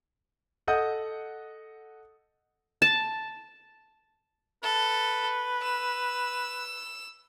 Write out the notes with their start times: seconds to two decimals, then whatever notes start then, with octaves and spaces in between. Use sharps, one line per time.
0.67 A4 D#5 F#5 D#6 G6
2.82 A5
4.63 A4 B4
5.63 E6